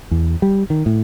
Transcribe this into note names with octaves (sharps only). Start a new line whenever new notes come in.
E2
G3
D#3
A2